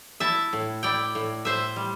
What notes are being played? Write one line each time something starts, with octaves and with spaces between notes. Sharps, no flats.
E4 E5 A5
A2
E4 D5 G5
A2
A2 C5 E5
G3